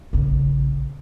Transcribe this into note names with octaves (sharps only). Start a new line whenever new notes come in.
A#1 C#3